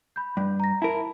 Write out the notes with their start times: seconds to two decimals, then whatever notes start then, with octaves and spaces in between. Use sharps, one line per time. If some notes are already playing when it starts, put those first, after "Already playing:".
0.16 B5 G6
0.37 G2
0.60 A#5 A#6
0.82 E4 A#4 A5 B5